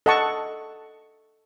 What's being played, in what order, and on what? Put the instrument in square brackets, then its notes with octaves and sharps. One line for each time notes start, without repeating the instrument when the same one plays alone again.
[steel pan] A4 D#5 F#5 A5 C#6